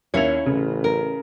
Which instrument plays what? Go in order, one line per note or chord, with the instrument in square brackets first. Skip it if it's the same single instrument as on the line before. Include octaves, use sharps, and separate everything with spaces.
[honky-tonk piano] D#2 E5 F7 [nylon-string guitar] C#4 E4 C#5
[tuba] A1 [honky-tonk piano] C#3
[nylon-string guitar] A#4